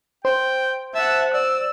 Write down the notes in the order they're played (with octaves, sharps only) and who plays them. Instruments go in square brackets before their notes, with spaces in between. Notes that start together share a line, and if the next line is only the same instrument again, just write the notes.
[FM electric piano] C5 [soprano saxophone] G5
[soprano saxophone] E5 [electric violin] F#5 A5
[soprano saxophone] D5 [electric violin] E6